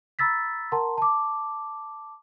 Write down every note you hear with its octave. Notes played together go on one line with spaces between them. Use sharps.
A#5 B5 E6 A6 B6
A#4 F#5 A5 A#5 C6
A5 D6